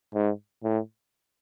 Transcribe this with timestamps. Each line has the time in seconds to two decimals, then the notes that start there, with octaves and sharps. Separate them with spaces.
0.15 G#2
0.63 A2